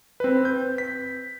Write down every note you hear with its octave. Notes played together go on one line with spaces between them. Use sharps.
C4 B4
G6
B6